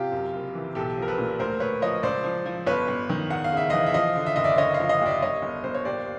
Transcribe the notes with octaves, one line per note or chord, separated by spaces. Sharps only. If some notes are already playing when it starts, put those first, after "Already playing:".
Already playing: C3 F4 G4
F#2
F#1
E3
B1 G4 A4
F3
A#4
A4 B4
A#2
D2 A#4 C5
D2 B4 C#5
F3 C#5 D#5
C#2 C5 D5
F3
F3
G1 B4 C#5
G1
D#3
E2 F#5
F5
C#3 E5
E3 D#5 F5
E5
F3 D#5 F5
D3
E5
F#1 D#5
D5 E5
D3 C#5 D#5
D#5 F5
F3
D#5 F5
D#2 D5 E5
G2 C#5 D#5
G1
G1 C5
C#5
D#2 C5 D5